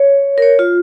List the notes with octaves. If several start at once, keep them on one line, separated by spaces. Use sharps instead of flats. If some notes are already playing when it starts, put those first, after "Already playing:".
Already playing: C#5
A#4
C#5
F4